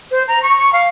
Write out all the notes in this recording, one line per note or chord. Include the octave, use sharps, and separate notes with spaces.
C5
A#5
C#6
C#6
F5